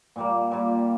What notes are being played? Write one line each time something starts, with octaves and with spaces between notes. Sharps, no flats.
A#2 G3 A#3
A#2 G3 A#3